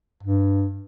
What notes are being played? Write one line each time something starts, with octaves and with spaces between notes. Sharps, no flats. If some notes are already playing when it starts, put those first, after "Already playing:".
G2